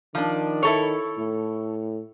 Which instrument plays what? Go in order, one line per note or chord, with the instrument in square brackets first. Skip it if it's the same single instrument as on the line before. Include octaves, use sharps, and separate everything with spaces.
[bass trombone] D#3 [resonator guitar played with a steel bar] F3 D4
[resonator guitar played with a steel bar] E4 A4 C#5
[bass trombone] A2